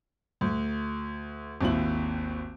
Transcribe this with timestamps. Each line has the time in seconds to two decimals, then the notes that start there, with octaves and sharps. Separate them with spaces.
0.41 D2
1.61 G#1 D#2 E4 F#7